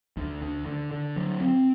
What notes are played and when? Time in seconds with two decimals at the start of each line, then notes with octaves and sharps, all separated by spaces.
0.17 D2
0.42 D3
0.66 D3
0.92 D3
1.16 F#3
1.40 C4